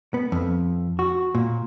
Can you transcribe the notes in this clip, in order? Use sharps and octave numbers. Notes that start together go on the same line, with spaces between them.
B3
F2
F#4
A#2